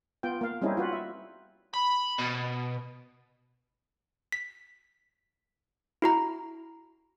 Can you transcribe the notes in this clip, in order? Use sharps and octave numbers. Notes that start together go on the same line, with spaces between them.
B3 F4 G5
A#3 F5
G3 C4 C#4 D#4 E4 G#4
F4 F#4 B4
E5
B5
B2
B6
E4 F#4 A#5